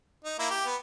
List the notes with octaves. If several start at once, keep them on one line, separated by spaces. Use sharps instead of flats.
D#4
A#3 E4
G4
B3